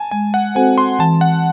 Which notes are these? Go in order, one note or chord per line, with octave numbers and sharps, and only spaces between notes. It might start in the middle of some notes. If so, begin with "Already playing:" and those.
Already playing: G#5 A5
G#3 G#5
F#5
C4 F#4 A4 C5 G#5
C6
E3 A5
F#5